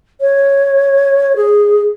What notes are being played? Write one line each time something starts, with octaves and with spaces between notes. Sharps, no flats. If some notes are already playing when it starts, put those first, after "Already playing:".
C#5
G#4